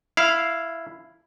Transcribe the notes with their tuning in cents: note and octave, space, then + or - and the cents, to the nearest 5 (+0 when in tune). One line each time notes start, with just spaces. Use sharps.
E4 +5 F5 -5